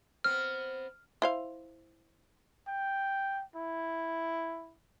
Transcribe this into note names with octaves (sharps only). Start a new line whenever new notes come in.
B3 C4 F6
E4 C5 F5
G5
E4